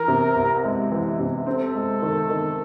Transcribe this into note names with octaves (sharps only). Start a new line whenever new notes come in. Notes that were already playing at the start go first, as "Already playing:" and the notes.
Already playing: E3 A#4
C3
C2
G#3
E3
C3
C4 A4
G#3
D#3
D#3